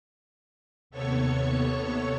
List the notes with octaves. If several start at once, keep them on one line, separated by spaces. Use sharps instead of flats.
D#2 C3 B3 A4 C#5 C#6